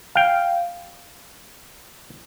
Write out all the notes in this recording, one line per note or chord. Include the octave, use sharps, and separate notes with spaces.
F5 G5